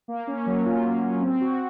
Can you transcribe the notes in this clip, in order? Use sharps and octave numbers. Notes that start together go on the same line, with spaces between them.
A#3
C#4
F#3
F4
A#3
C#4
C4
F#4